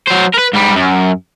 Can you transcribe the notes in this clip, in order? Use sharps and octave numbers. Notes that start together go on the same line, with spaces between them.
F#3 C5
A#4 B4
G#2 G3
F#2